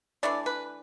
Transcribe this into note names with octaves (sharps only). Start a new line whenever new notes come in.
E3 A3 D4 D5
B4